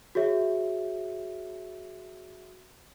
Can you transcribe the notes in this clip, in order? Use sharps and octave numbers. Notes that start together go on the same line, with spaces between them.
F#4 G#4 C#5 E5